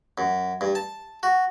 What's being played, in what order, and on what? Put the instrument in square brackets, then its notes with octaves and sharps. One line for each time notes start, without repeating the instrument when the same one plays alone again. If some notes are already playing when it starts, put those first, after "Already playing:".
[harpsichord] F#2
G2
A5
F#4